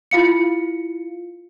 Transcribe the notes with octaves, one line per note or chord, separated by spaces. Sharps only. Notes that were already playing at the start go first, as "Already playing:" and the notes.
E4 F4 F5 C#7